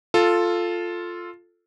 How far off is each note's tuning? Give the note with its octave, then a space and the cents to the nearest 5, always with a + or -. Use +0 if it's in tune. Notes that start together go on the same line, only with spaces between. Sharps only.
F4 +0 A4 +0